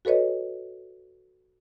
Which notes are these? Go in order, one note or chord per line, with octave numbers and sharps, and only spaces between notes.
F#4 A4 B4 C#5 D#5